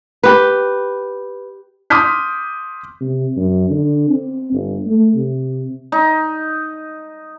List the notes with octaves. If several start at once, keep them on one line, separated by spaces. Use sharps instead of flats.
G4 B4
C6 D6 D#6 F6 G6 B6
C3
F#2
D3
C4
G1
A3
C3
D#4